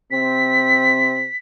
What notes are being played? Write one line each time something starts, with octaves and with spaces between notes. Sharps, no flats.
C3 C4 B6